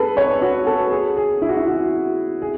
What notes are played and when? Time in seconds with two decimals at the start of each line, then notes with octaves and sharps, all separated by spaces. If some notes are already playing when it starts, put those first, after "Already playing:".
Already playing: G#4 A4 B4
0.17 C#5
0.42 F#4
0.67 A4
0.91 G#4
1.17 G#4
1.42 E4
1.49 F#4
1.57 E4
1.67 F#4
2.42 G#4